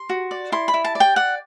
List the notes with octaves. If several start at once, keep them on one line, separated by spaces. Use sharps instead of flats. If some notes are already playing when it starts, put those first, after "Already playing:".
Already playing: C6
F#4
D5
E4 C6
B5
E4
A5
D5
G5
D5 F#5